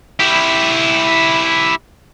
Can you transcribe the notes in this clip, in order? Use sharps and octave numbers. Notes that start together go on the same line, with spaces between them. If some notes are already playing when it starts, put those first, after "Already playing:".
E4 G4